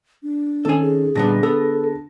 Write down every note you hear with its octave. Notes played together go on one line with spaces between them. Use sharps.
D4
D#3 C4 C#4 A4 G#5
G#4
A#2 D3 G3 B3 A5 A#6
B3 A4